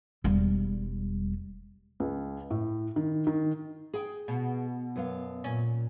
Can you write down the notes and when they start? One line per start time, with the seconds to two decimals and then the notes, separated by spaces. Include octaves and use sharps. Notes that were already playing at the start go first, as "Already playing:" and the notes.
0.24 E1 G3
2.00 C#2
2.50 A2
2.96 D#3
3.27 D#3
3.93 G#4 G5
4.28 B2
4.96 F#2 B3 F5
5.44 A#2 C#4